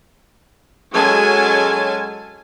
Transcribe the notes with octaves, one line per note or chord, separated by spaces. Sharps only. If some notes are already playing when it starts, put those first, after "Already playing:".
F#3 G#3 C#4 A4 G#5 A5